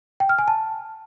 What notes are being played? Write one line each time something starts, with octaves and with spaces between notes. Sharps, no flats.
G5
F6
G#5
A5